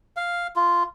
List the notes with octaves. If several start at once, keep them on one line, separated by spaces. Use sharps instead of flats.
F5
F4